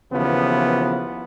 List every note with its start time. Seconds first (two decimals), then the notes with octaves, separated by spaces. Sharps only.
0.12 D#2 C#3 E3 F3 B3